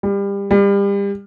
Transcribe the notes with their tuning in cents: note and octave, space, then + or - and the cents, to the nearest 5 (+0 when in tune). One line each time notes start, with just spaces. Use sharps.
G3 +25
G3 +30